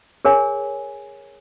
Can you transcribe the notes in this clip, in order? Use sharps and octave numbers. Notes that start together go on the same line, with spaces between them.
G#4 A#4 C#5 G#5